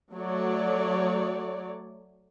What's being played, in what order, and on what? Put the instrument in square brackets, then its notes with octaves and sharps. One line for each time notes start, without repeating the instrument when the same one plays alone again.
[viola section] F#3 A3 C#5 D5